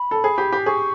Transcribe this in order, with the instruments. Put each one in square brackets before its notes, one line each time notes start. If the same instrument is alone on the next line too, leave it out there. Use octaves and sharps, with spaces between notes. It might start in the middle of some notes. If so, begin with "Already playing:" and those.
Already playing: [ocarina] B5
[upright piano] A4
G#4
G4
G4
[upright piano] G#4 [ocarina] C#6